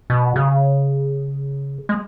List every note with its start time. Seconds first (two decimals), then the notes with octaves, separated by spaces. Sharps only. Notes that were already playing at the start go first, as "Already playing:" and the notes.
0.10 B2
0.36 C#3
1.89 G#3